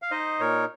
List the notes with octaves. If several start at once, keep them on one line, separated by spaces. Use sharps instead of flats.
F5
D#4 C5 D#5
A#2 A#4 C#5